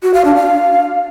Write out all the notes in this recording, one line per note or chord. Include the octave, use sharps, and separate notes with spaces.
F#4
F5
D4
F5